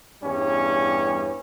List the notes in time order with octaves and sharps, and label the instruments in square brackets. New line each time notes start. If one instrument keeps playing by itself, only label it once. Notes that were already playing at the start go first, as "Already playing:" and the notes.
[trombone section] E2 G2 G3 C#4